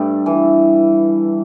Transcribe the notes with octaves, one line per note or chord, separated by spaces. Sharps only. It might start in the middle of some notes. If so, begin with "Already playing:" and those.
Already playing: G2 G3 A3
E3